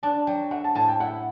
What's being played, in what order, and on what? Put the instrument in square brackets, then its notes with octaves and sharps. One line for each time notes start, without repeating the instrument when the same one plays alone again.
[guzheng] D4 [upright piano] A5
[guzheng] F#3 [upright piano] G5
[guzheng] A3 [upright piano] F#5
[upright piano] A5
[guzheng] A2 [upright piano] A5
[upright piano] G5
[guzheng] E4 [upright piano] F#5